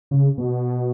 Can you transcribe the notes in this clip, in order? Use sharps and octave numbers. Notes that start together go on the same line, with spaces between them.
C#3
B2